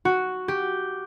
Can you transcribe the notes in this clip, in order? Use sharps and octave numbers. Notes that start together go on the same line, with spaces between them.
F#4
G4